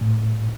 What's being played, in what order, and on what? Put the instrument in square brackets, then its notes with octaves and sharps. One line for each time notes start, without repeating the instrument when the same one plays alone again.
[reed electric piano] A2